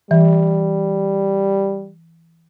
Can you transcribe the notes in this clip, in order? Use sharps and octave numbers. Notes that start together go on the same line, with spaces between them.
E3 G3